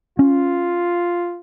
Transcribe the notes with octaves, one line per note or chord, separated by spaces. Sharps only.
C#4 F4